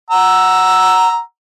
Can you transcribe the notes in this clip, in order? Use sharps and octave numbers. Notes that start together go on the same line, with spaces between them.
F#5 A#5 E6